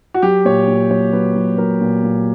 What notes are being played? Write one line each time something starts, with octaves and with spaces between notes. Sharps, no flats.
F#4
F#3 G4
A#2 C#5
A#2
F#3 C#5
F#3 B4
F#3
F#3 A#4
A#2
A#2